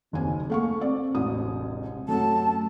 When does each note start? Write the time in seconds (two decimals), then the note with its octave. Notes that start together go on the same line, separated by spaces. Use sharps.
0.13 F#1 D#2 C3 G#5
0.50 A3 A#3 F5 C#6
0.81 C4 D5
1.15 E1 A1 C3 D#6
2.08 F#2 F#3 A3 A5